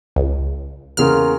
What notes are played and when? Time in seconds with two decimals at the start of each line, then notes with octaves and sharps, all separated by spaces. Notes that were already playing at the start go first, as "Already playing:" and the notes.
0.16 C#2
0.97 E2 C#3 A#3 F4 A#4 F6